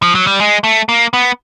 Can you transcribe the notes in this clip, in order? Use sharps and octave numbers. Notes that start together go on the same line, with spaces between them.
F3
F#3
G3
G#3
A3
A#3
B3